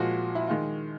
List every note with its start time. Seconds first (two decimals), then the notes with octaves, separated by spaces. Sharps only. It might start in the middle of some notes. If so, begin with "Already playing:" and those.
Already playing: A#2 F3 G#3 F#4
0.35 E4
0.47 D#3 G#3 F4